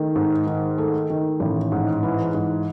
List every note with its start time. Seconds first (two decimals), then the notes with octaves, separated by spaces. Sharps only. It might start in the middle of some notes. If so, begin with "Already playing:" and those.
Already playing: D#3 A3
0.15 G#2
0.47 D#3
0.78 A3
1.10 D#3
1.40 A1
1.72 G#2
2.03 E3
2.34 G#2